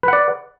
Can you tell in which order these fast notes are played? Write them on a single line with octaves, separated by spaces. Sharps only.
B4 F#5 D5